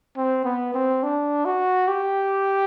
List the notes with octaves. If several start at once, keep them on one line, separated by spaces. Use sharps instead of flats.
C4
B3
C4
D4
F#4
G4